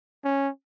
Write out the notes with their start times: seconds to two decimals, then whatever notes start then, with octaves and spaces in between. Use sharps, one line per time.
0.25 C#4